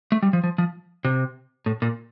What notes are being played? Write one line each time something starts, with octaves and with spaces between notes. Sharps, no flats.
A3
G3
F3
F3
F3
C3
A2
A#2